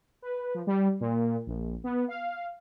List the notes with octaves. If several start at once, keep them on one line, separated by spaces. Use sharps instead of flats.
B4
F3
G3
A#2
A#1
B3
F5